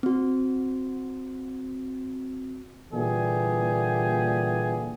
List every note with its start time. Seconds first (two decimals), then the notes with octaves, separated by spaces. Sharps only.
0.03 C4 F#4
2.92 A#2 D3 E3 G3 G4 G#4